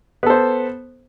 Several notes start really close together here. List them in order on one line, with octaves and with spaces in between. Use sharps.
B3 A4 C5